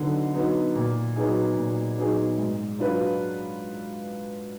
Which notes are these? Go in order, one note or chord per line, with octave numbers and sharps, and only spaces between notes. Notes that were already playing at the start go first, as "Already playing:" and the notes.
Already playing: D3 F#3 B3 D#4
F#3 B3 D#4
A#2
F#3 B3 D#4 G#4
A#2
F#3 B3 D#4 G#4
G#2
F#3 D4 F4 B4